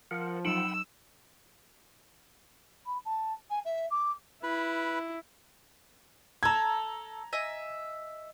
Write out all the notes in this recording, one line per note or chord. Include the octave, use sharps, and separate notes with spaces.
F3 A#4 F#5
F#3 D#4 F#5 G5 B5 E6
B5
A5
G#5
E5
D6
E4 B4 B5
A4 A#5 E6 G#6
D#5 E5 G#5